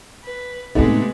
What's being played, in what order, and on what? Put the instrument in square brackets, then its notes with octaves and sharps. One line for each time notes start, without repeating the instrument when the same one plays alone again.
[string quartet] B4
[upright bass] A2 D#3 [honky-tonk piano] C3 A3 B3 [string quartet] G#3 B4